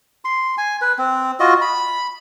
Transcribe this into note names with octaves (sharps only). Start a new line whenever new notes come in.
C6
G#5
B4
C4
F4 F#4 D#5
B5